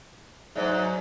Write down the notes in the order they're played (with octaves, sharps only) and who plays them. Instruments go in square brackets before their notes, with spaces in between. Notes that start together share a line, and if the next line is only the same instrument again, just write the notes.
[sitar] G#2 [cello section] F#3 D#4 [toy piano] C5 D5 E5